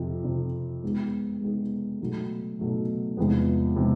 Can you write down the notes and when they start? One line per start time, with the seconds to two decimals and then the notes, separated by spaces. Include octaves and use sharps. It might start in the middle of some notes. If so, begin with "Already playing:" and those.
Already playing: F2 C3 F3
0.24 F2 C3 F3
0.84 G#3 B3 D#4 G#4
1.41 G#3 B3 D#4 G#4
2.00 B2 F#3 A3
2.59 B2 F#3 A3
3.17 E2 C3 F3 G#3 B3
3.76 C3 F3 G#3 B3